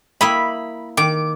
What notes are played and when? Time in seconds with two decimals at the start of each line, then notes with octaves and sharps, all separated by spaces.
0.21 A#3 E4 D#5 B5
0.97 D#3 D6